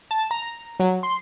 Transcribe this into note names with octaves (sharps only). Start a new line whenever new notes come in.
A5
A#5
F#3
C6